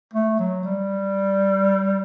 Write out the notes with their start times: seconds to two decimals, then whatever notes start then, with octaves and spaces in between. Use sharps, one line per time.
0.14 A3
0.39 F#3
0.65 G3